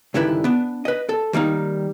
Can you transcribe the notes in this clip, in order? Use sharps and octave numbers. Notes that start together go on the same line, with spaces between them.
C#2 G2 D3 D#3 E4 B4
B3 D4
B4 D#5
A4
D#3 G3 A#3 D#4